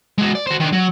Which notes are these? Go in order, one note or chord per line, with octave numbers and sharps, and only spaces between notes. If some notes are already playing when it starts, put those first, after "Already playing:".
G#3 F#4
D5
F#4 C5
D#3 D4
F#3